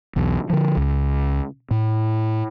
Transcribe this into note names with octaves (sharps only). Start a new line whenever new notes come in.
B1 E2
D3 F3
C#2
A2